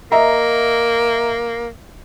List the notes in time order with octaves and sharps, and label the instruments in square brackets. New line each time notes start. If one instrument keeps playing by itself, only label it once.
[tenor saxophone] A#3 [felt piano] D#5 E5 A#5